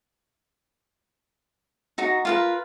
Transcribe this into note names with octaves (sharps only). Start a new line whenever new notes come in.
D#4 F#4 A#5
F4 A#4 B4